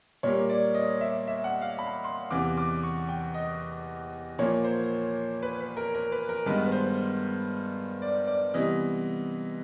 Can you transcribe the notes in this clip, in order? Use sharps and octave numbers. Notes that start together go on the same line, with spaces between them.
A#2 G3 A#3 C#5
D5
D#5
E5
E5
F#5
F5
B5
C6
E2 C3 E3 D6
D6
C#6
G5
D#5
A#2 F3 A#3 C#5
C5
B4
B4
A#4
A#4
B4
A#4
G2 D#3 G#3 B3 B4
B4
C5
D5
D5
C3 E3 G3 B3 D#5